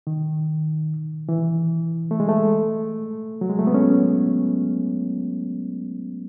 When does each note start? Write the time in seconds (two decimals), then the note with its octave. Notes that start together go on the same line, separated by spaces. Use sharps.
0.07 D#3
1.29 E3
2.11 A3
2.20 G#3
2.28 A3
3.41 F#3
3.50 G#3
3.59 A3
3.67 B3
3.74 C#4